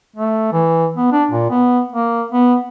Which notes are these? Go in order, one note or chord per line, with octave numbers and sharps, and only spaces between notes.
A3
E3
B3
D4
A#2
B3
A#3
B3